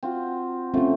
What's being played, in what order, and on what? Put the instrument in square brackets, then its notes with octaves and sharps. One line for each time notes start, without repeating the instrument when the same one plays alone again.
[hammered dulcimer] C4 F4 F#4
[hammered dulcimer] F3 A3 [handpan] C4 C#4